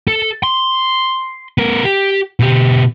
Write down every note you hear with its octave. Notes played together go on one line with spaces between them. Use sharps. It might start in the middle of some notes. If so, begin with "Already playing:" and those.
A4
C6
B3 A#4
G4
B2 G4